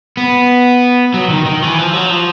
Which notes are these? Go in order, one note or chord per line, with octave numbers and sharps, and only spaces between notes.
B3
F#3
D#3
D#3
E3
F3
F#3
F3